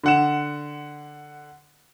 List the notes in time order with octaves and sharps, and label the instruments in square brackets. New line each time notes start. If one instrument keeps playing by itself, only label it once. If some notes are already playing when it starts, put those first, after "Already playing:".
[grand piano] D3 F#5 E7